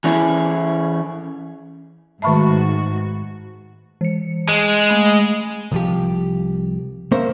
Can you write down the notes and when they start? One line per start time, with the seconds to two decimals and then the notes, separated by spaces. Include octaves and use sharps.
0.04 E3 C#4 E4 G#4
2.22 G#2 D#3 A3 F#4 E5 A5 B5 C#6
4.01 E3 C#7
4.49 G#3
4.89 A3 B5
5.72 C2 F3 G4
7.12 A#3 C#4 A#4 C5 E5